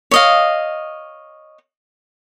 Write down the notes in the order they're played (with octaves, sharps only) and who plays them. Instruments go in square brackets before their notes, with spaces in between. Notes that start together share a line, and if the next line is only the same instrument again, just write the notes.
[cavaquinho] C#5 D#5 F5